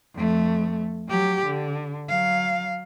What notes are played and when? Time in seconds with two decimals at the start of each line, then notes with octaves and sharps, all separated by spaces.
0.15 F2 A3
1.09 F#3 G4
1.46 D3
2.09 F#3 F5